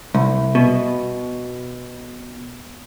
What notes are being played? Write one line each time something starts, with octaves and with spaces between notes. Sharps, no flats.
C2
B2